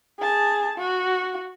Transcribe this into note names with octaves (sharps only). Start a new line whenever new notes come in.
G#4 A5
F#4